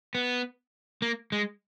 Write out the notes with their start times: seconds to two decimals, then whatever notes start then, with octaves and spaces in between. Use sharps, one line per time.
0.15 B3
1.02 A#3
1.32 G#3